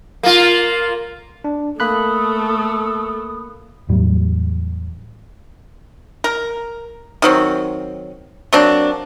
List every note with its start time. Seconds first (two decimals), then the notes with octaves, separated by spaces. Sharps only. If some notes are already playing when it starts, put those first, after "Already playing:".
0.23 A#3 F4
1.44 D4
1.80 A3 A#3 A4 B5 D#6 F#6
3.89 E2 A2 F#3 G3
6.24 A#4
7.22 D#3 F#3 C4
8.53 F#3 A#3 C4 D4